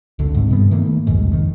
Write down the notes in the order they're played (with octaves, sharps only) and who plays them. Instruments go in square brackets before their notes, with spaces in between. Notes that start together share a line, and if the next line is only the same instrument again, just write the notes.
[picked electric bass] F#1 C#2 D3
G#2 C3
G2 B3
D#3 A3 A#3
F#1 C2 F2 G#2
D#3